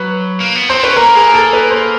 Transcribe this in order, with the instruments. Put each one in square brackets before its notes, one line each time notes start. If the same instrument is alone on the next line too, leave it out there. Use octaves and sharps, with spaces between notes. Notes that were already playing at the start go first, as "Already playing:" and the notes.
Already playing: [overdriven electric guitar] F#3 [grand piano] B4
[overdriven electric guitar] A#3
B3
[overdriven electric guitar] C4 [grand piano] C5
[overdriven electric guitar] C#4 [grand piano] B4
[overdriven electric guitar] A#3 [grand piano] A#4
[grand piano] G#4
A4
B4
C5